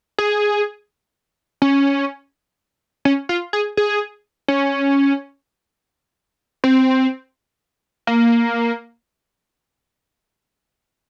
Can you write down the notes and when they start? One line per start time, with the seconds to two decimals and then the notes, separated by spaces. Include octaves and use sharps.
0.18 G#4
1.62 C#4
3.05 C#4
3.29 F4
3.53 G#4
3.77 G#4
4.48 C#4
6.64 C4
8.07 A#3